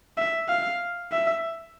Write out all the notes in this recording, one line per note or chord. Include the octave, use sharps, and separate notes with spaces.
E5
F5
E5